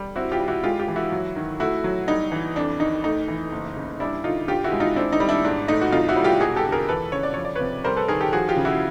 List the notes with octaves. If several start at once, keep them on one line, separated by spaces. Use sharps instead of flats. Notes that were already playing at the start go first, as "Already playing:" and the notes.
Already playing: G3
C4 E4 F#4
F4 G4
G3
E4 F#4
G#3 F4 G4
F4 G4
E3
E4 F#4
F#3
D#3
A3 E4 F#4
F#3
G3 D#4
E3
F2 D4
D#3 D#4
A3 D#4
E3
F#1
C#3
G3 D4 E4
D3 D#4 F4
G2 F4 G4
E4 F#4
G#3
D#4 F4
C4 D4 E4
D#4
G3
D4 E4
G#2 D4
A3 D#4
F#4
C2 D#4 F4
E4 F#4
G3
F4 G4
E1 F#4 G#4
G4 A4
D3
G#4 A#4
E3 A4 B4
C#3 C#5
D5
F3 C#5
D5
C3 B4 C#5
G3 A#4 C5
A4 B4
D#3 G#4 A#4
G4 A4
F3 F#4 G#4
F4 G4
C#3
E4 F#4